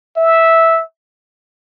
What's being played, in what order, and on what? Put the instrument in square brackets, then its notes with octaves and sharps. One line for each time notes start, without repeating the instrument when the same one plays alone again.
[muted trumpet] E5